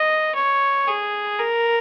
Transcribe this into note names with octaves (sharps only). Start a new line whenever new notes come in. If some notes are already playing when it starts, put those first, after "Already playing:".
Already playing: D#5
C#5
G#4
A#4